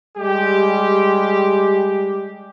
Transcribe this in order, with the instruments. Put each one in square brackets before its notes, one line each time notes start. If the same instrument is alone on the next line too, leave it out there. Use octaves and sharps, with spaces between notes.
[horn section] G3 G#3 G4